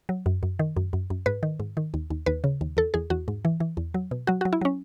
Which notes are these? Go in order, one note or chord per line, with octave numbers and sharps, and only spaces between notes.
F#3
F#2
F#2
D#3
F#2
F#2
F#2
G#2 B4
D#3
G#2
D#3
D#2
D#2
D#2 B4
C#3
D#2
E2 A4
E2 G#4
E2 F#4
G#2
E3
E3
E2
F#3
B2
F#3 F#4
F#3 F#4
E4
F#3 C#4